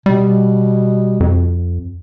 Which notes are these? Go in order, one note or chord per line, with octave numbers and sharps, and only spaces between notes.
B2 G3
F2